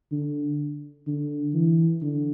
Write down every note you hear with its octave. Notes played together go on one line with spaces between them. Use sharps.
D3
D3
E3
D3